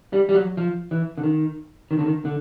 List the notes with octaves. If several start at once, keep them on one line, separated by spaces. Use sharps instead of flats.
G3
G3
F#3
F3
E3
D3
D#3
D#3
D3
D#3
D3